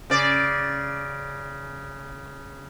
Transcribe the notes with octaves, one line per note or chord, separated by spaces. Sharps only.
C#3 D5